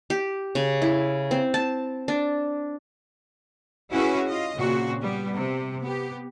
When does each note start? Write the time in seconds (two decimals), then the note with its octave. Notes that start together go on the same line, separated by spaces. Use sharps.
0.10 G4
0.55 C#3
0.82 E4
1.31 C4
1.54 A5
2.08 D4
3.91 C#4 E4 F#4 G#4 B4
4.27 F4 D#5
4.57 A#2 C#3 C4 F#4
5.01 G3 B3
5.34 C3
5.81 B3 G4